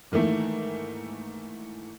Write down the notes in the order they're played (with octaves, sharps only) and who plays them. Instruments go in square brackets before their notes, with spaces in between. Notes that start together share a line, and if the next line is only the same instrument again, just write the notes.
[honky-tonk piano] G#2 D#3 E3 A3 A#3